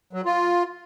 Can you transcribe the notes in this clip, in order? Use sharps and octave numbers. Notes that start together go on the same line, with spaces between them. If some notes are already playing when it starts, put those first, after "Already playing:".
F#3
F4